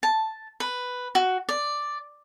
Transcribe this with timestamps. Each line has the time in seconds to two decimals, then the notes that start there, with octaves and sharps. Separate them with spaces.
0.03 A5
0.60 B4
1.15 F#4
1.49 D5